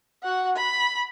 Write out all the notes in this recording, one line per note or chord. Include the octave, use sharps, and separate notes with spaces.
F#4 F#5
B5